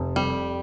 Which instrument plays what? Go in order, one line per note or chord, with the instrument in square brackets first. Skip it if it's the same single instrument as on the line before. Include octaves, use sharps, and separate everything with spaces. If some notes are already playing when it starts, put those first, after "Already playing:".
Already playing: [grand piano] F1
[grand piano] F2 [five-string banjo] G3